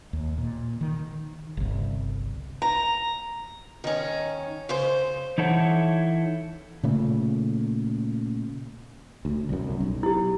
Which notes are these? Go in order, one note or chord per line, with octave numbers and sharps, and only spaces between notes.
D#2
A#2
D#3
G1 C2
A#5
D#3 C#4
C#3 C5
E3 D#4 E4 A4 C#5 F#5
A#2 C#3 A3
D2
C2 F#2
B1
E4 G4